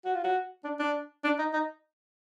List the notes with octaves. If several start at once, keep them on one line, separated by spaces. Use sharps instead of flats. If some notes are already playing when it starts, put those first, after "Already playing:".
F#4
F4
F#4
D4
D4
D4
D#4
D#4